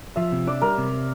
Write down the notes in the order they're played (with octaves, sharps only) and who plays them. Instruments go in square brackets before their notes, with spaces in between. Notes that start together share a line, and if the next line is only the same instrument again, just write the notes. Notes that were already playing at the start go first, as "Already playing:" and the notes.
[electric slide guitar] F3 [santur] E5
[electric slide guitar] C3
[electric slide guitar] D4 [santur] D5
[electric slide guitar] G3 [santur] A#4
[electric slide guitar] C3